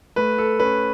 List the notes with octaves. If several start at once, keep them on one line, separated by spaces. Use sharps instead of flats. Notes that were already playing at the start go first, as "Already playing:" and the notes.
A3 B4
A4
C#4 B4